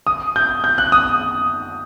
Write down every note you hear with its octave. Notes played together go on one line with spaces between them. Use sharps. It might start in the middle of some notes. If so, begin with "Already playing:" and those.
D#6
G6
G6
F#6
D#6